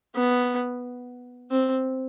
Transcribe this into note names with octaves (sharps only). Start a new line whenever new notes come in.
B3
C4